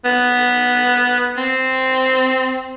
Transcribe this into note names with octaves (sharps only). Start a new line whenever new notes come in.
B3
C4